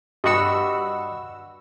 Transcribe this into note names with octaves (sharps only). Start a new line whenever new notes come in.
G2 F#4 G4 D#5 B5 E6 C#7